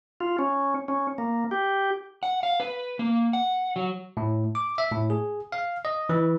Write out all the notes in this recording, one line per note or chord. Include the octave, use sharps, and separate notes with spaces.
F4
C#4
C#4
A#3
G4
F#5
F5
B4
A#3
F#5
F#3
A2
D6
E5
A2
G#4
F5
D#5
E3